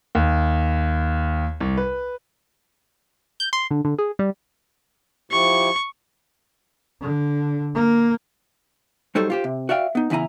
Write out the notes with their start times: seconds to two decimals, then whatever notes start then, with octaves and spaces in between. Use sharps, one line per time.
0.15 D#2
1.61 C2
1.77 B4
3.40 G6
3.53 C6
3.71 D3
3.85 D3
3.99 G#4
4.19 G3
5.31 F3 E4 G4 C#6
7.01 D3
7.74 A#3
9.15 F#3 G3 D#4 A4 C5 C#5
9.30 F4 G4 C5
9.44 C3
9.69 F#4 D5 E5 F5 G5
9.95 B3 D#4
10.10 E2 C#3 E4 G#5 A#5